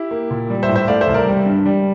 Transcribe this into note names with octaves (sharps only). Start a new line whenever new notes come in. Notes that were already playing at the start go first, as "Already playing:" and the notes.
Already playing: E4 G4
A#3
A#2
G3
C5 E5
A2
C5 E5
A3 D5 F5
C5 E5
C2
A#4 D5
G3
G2
G3